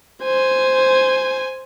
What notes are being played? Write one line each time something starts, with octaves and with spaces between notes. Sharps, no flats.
C5 G#5